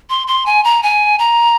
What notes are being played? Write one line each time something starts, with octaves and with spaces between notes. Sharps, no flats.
C6
C6
G#5
A#5
G#5
A#5